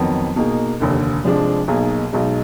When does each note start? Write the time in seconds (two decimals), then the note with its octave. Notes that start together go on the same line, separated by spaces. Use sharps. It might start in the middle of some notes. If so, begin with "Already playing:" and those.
Already playing: F2 D#3 F#3 B3
0.36 B2 A#3 D#4 G#4
0.80 F1 D#2 D3
1.24 F1 F2 F3 G#3 D4
1.68 B1 B2 A#3 D#4 G#4
2.12 B1 B2 G#3 D#4